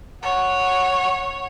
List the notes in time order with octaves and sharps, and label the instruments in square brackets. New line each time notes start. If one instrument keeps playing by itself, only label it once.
[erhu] C#5 [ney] F#5